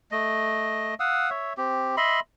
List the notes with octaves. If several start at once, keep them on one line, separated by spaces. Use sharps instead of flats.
A3 D#5
F5 F#5 D#6 E6
C#5 E5
C4 G4
D#5 E5 B5 C6